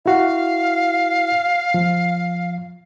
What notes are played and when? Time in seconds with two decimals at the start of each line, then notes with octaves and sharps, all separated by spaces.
0.06 E4 F#4 F5
1.74 F3